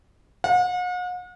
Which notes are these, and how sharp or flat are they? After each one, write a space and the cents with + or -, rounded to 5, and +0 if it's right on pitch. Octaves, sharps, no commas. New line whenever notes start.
F#5 -45